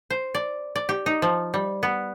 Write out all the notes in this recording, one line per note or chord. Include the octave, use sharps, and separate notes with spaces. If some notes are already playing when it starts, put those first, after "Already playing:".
C5
D5
D5
G4
D#4
F3
G3
B3